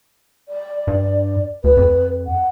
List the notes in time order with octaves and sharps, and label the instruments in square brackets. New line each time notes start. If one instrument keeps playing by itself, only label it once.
[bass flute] D5
[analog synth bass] G2
[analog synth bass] D2 [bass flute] B4
[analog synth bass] F2
[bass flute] F#5